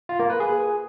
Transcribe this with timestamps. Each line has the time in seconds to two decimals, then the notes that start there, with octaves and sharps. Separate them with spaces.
0.09 F4
0.19 A#3
0.30 B4
0.40 G#4